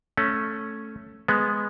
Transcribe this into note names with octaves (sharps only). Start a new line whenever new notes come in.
A3 C#4
G#3 B3